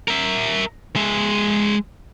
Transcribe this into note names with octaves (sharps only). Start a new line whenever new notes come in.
A#4 E5
G#3 E5